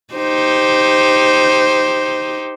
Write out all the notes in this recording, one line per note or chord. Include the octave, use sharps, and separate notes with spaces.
D#4 G4 C5